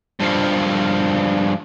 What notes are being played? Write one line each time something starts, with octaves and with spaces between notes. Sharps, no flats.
G2 F3